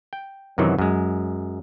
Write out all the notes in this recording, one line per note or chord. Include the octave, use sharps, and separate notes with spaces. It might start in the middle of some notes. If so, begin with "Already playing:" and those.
G5
F#2 C3 D#3 E3 F#3
F#2 G#3